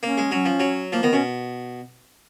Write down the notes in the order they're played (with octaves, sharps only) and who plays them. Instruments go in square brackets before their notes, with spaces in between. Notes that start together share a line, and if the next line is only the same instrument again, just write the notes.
[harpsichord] A#3 [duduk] C#4
[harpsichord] G#3
[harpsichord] F#3 [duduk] C#4
[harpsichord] F3
F#3
[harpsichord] F3 [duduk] A#3
[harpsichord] D#3 [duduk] B3
[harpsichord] B2 [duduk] C#4